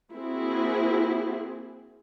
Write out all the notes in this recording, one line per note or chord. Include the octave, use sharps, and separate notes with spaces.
A#3 C4 E4 F#4 G#4